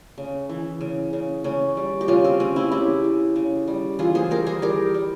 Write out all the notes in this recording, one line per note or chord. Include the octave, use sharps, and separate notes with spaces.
C#3
E3
C#3
C#3
C#3 C#4
G3
G4
C#3 C#4 F4
C4
C#3 C#4
C4 E4
C#3 E4 G4
C#3
C#3
G3
E3 F4 G#4
G#4 C5
G3 G4 A#4
G#4 C5
G3 G4 A#4
G3